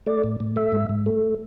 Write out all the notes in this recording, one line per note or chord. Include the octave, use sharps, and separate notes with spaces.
A3 D5
A2
A2
A3 E5
G#2
G#2
A3